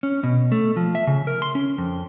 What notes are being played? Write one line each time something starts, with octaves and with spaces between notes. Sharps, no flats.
C#4
B2
A3
F3
E5
C#3
A#4
C6
C#4
F2